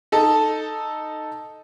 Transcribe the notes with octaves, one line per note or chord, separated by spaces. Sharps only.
D#4 A4 A5